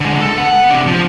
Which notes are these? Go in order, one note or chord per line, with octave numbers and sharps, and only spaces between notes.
D3 G#3
A4
B3 F#5
C3 D4
F3